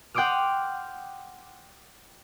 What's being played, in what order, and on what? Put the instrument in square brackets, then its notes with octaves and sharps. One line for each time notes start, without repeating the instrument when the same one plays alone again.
[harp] F#5 G5 C6 D6 D#6 F6